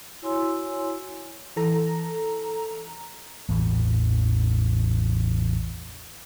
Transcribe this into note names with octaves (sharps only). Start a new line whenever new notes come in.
E4 F#4 C#5 G#5 C6 E6
E3 A4 A#5
A1 E2 G2 A#2